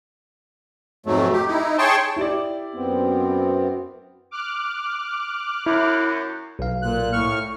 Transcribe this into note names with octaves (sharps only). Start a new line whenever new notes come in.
F2 G#2 B2 F#3 A3
G4
D#4 E4
G#4 C#5 G5 A5 C6 C#6
E4 G4 D5
F#2 B3 C4
D6 F6 F#6
F#2 E4
B1 F5
A#2 F#6
A2 C#6 F6